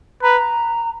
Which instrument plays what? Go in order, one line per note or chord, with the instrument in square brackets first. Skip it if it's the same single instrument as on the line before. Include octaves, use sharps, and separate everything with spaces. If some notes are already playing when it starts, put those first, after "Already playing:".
[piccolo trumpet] B4 [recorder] A#5